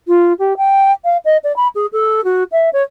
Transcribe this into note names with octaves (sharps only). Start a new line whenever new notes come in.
F4
G4
G5
F5
D#5
D5
B5
G#4
A4
F#4
E5
C#5